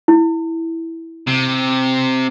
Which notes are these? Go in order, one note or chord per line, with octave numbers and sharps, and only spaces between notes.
E4
C3